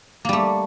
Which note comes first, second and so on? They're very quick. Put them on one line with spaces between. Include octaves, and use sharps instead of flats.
A#3 G3 A3